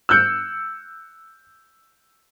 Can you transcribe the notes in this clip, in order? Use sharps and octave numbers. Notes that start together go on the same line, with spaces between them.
E6 F#6 G6 C#7